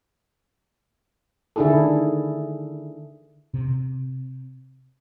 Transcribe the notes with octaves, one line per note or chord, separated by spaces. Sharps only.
D3 D#3 D4 E4 G#4 A4
C3